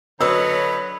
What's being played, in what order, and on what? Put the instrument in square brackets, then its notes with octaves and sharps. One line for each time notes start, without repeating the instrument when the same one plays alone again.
[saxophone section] D3 F#3 [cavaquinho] B4 D#5 [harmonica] C#5 B5 [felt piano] E6